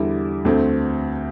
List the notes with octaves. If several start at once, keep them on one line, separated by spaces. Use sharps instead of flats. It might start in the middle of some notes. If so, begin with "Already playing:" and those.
Already playing: E2 D3 G3 E4
D2 D3 A3 C4